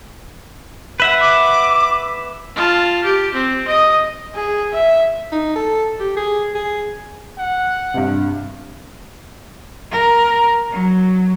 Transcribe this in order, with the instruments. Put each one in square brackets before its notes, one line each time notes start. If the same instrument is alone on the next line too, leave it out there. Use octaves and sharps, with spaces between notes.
[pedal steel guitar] B4 E5 F#5
[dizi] D6
[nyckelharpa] F4 A5
G4
C4
D#5 D#6
[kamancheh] G#4
E5
[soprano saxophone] D#4
A4
G4
G#4
G#4
[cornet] F#5
[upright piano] G2 C3
[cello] A#4
F#3